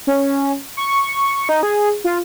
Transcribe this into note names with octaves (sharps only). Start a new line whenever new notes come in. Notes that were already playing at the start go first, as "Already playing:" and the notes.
C#4
C#6
D#4
G#4
F4